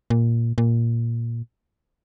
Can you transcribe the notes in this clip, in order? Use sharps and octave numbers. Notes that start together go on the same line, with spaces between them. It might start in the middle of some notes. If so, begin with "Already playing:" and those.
A#2
A#2